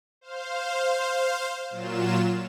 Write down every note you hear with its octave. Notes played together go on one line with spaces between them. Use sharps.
C5 F5
A#2 F#3 F4 E7